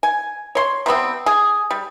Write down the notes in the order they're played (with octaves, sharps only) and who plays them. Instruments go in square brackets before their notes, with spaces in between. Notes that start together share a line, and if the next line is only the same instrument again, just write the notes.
[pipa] G#5
C#5 C6
C3 G3 B3 C4
G#4
G3